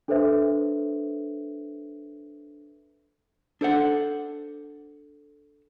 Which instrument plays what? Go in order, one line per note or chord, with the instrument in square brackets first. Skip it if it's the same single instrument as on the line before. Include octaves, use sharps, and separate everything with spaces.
[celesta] D4 A4 B4 C5 E5
[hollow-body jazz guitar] D4 A4 C5 F#5